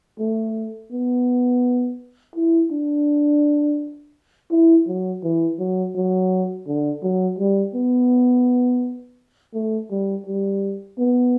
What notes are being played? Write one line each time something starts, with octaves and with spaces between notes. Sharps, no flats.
A3
B3
E4
D4
E4
F#3
E3
F#3
F#3
D3
F#3
G3
B3
A3
G3
G3
B3